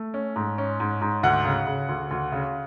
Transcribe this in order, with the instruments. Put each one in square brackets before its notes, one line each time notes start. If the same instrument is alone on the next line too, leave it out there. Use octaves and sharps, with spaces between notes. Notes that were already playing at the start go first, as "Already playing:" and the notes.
Already playing: [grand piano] A3
C#4
G#2
C#4
G#2
G#2
D2 F#5
C#3
C#3
D2
D2
C#3